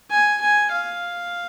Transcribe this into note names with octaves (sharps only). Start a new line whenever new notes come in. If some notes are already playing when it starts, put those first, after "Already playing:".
G#5
G#5
F5